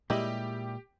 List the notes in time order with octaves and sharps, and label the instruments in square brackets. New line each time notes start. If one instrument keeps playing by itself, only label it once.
[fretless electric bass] A#2 G#3 [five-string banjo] G3 E4 D#5 [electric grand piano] G4